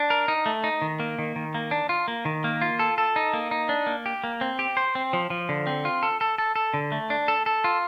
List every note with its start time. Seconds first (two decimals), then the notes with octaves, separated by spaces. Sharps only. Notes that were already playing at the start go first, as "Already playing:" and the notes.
Already playing: D4
0.10 A#4
0.28 D#4
0.46 A3
0.64 D#4
0.82 D#3
1.00 A#3
1.19 D#3
1.36 D#3
1.55 A#3
1.71 D4
1.89 F4
2.08 A#3
2.25 D#3
2.44 A#3
2.62 F4
2.79 A4
2.98 A4
3.16 D#4
3.33 A#3
3.51 D#4
3.69 D4
3.87 A#3
4.06 G4
4.24 A#3
4.41 C4
4.59 G4
4.77 C5
4.95 C4
5.13 F3
5.30 F3
5.49 D3
5.67 C4
5.85 F4
6.03 A4
6.21 A4
6.38 A4
6.56 A4
6.74 D3
6.92 A3
7.10 D4
7.28 A4
7.46 A4
7.64 F4